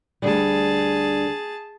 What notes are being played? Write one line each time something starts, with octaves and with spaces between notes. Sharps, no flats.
D2 D3 G3 G#4 A5